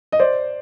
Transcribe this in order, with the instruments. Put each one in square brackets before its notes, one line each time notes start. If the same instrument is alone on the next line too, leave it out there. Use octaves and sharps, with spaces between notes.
[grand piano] D#5
C5 D5